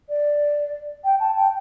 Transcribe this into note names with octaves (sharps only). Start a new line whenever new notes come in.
D5
G5
A5
G5